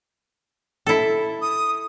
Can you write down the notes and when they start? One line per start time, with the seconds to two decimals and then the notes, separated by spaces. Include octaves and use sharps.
0.87 E4 A4
1.42 D#6